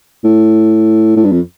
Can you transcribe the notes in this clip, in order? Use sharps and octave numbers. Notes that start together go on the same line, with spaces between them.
A2
A2
G2
F2